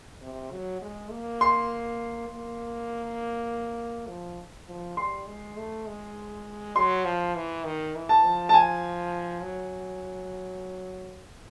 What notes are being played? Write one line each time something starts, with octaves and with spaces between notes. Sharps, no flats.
C3
F#3
G#3
A#3
C6
A#3
F3
F3
G3 C6
G#3
A3
G#3
F#3 C6
F3
E3
D#3
E3
A5
F3
A5
G#5
F#3